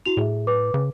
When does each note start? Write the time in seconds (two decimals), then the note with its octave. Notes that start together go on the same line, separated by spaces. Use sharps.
0.06 E4 F#4 F7
0.17 A2 G#4 E5
0.47 B4 D6
0.74 C#3